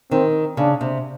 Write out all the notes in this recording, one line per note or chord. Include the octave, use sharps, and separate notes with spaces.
D#3 C4
C#3 D4
C3